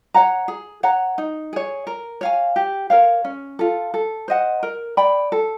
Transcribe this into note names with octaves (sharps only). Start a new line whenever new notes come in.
C#5 F#5 A#5
G#4
C#5 F#5 A#5
D#4
G#4 C#5
A#4
C#5 F5 G#5
G4
A#4 C#5 F5
C#4
F4 A4
A4
C5 D#5 F#5
A#4
D5 G5 B5
A4